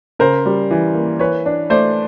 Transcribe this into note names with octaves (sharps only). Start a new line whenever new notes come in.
C#3 A#4 C5
G3
E3
A#3
E3 B4 C#5
D4
A3 C5 D5